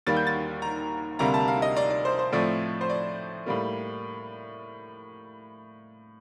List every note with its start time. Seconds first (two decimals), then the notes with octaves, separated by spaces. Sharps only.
0.06 D#2 D#3 G3 A#3 A6
0.17 G6
0.27 A6
0.62 A#5
1.19 D2 C3 G3 A#3 A#5
1.34 A5
1.48 F5
1.62 D#5
1.77 D5
1.90 D5
2.05 C5
2.19 C5
2.33 A2 F3 A3 C4 D5
2.81 C5
2.89 D5
3.46 A2 G3 A#3